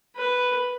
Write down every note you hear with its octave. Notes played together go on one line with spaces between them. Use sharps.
B4